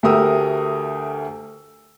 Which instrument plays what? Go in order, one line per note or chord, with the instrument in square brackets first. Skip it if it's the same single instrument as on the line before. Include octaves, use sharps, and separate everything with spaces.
[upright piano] D2 A3 G4 A#4 D#6 E6